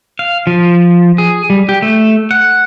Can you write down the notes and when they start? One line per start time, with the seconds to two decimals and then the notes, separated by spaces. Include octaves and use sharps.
0.19 F5
0.47 F3
1.18 G#4
1.50 G3
1.69 G4
1.82 A3
2.31 F#5